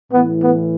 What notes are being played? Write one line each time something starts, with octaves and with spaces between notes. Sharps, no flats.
A2 E3 B3
B3